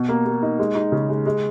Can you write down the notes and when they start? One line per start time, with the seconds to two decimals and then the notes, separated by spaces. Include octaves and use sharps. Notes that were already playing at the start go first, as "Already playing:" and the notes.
Already playing: B2
0.09 A#3
0.26 A#3
0.42 D#4
0.59 G#3
0.75 D#4
0.92 C#3
1.09 G#3
1.26 G#3